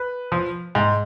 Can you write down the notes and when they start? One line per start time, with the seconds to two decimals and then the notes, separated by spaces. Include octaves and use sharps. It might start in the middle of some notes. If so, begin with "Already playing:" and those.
Already playing: B4
0.32 F3
0.75 G#2